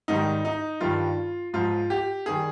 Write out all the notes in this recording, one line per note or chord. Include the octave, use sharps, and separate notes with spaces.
G#2 D#3 G3 D#4
D#4
G2 D#3 G3 F4
G#2 F3 F4
G4
D#3 G3 G#4